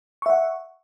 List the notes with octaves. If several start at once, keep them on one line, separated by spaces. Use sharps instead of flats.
E5 F#5 C#6